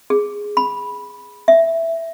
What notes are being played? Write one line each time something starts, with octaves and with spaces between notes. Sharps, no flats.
G#4
B5
E5